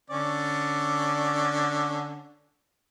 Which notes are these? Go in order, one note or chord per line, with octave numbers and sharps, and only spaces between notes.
D3 C#4 D5